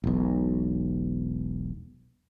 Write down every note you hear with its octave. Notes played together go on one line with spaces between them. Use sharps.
E1 B1